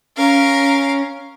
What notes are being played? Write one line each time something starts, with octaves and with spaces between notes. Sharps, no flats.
C#4 A#4 F5